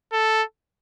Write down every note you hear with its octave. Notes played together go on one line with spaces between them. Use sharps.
A4